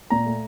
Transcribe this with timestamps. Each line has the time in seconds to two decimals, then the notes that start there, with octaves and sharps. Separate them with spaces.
0.10 A#2 A#5
0.26 A3